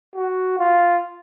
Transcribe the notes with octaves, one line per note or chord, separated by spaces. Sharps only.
F#4
F4